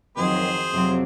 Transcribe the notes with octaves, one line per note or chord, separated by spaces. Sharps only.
F2 D#3 F#3 G#4 C5
F2 C3 F#3 C4